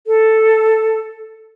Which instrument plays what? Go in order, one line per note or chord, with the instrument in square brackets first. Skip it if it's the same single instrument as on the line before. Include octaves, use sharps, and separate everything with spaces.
[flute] A4